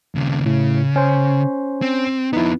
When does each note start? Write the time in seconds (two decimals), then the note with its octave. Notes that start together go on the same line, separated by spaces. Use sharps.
0.15 D#2 C#3
0.46 A2 C#3
0.96 C#4 C5
1.82 C4
2.33 F2 B3 D#4 E4